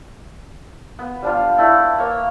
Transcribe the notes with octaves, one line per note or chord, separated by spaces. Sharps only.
B3
G3 D4 F4
A3 E4 D5
A#3 C#5